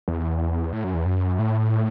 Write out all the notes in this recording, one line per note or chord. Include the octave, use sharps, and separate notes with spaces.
E2
A2
F#2
E2
F#2
A2